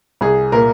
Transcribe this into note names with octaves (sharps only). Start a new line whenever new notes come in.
C2 G#4
A#2 A#4